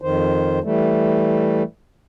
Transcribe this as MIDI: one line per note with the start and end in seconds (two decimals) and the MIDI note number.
0.02 0.59 41
0.02 0.59 51
0.02 0.59 72
0.64 1.63 52
0.64 1.63 55
0.64 1.63 57